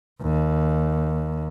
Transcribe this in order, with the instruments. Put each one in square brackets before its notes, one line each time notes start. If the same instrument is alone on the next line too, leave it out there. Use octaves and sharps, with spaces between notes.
[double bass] D#2